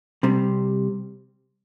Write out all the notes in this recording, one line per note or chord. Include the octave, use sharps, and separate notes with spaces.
C3 G3 C4